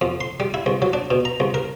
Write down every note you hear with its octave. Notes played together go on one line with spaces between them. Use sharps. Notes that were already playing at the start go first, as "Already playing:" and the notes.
F2
C6
G3
E4
C2
F#3
D4
B2
A#5
C2
A#4